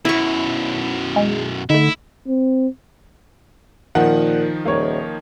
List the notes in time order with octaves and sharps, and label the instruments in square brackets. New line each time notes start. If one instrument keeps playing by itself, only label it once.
[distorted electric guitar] F#2 B2 [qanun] E4 C#6
[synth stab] G#3
[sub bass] D3 [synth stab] A3 D#4 [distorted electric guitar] E4
[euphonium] C4
[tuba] A#2 [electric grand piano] D#3 F3 D#4 [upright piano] F#5
[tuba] D#1 [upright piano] A#3 C#5